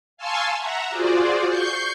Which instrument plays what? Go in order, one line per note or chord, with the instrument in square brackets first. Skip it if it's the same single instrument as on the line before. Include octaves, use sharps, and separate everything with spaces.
[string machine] F5 G#5 A5 C6 C#6 E6
E5 F#5 A#5
F4 F#4 G#4 C5 D5
C#6 G6 C7